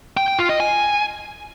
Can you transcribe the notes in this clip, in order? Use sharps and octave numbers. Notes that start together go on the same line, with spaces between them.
G5
G5
F4
D#5
G#5